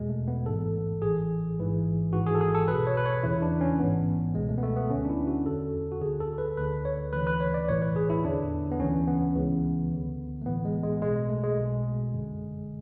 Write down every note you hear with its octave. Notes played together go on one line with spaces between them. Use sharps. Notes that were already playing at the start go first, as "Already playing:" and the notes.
Already playing: E2 B2 G#3
A3
B3
A1 G#2 E3 A4
A1 A2 E3 G#4
A1 G#2 E3
G#1 G#2 E3 F#4
G#4
A4
G#4
A4
B1 B2 B4
C#5
B4
C#5
E2 C#3 E3 E4
D4
C#4
A1 G#2 E3 B3
C#2 B2 G#3
A3
B3
A3
B3
D2 D3 C#4
D4
E4
F#4
E2 D3 A4
F#4
D2 D3 G#4
A4
B4
D2 D3 B4
C#5
D2 C#3 E3 B4
B4
C#5
D5
B1 A2 E3 C#5
B4
G#4
E4
E2 D3 D4
B3
D2 C#3 E3 C#4
B3
C#2 C#3 E3
D2 D3
A3
A1 A2 E3 B3
G#3
G#3
B1 B2 G#3
A3
G#3
B1 B2
G#1 F#2 D3